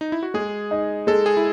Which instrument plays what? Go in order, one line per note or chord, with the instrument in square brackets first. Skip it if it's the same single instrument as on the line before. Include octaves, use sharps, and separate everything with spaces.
[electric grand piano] D#4
E4
F#4
[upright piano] G#3 [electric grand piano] G#4
[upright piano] D#4
[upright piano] G#3 [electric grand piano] A4
[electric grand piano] G#4
E4